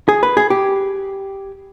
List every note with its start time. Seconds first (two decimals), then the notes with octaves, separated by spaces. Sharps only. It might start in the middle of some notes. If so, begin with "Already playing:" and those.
0.08 G#4
0.23 B4
0.37 G#4
0.50 G4